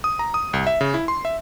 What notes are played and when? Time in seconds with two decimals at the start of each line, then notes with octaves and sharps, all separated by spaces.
0.04 D#6
0.19 A#5
0.34 D#6
0.53 C2
0.67 E5
0.81 C#3
0.94 E4
1.08 C6
1.25 E5